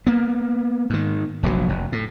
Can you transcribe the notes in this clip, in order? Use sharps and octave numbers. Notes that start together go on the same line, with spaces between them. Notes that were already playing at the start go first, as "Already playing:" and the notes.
A#3 B3
G#2 D#3
F1 A#1 G#2 F#3
F1
A2